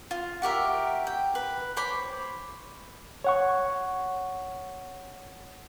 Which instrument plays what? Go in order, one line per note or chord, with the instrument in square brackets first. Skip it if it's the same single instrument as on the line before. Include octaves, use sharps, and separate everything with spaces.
[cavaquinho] F4
F#4 G4 A#4 E5
G5
B4
C5 C#5 B5 D6
[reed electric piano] C#5 F#5 C#6